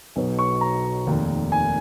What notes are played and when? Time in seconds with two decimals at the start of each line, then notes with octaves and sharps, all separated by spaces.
0.16 B1 B2 F#3
0.39 C#6
0.61 A#5
1.06 F1 D#2 D#3
1.52 G#5